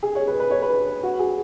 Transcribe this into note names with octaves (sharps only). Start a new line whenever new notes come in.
G#4
C#5
B4
B4
C#5
B4
F#4
G#4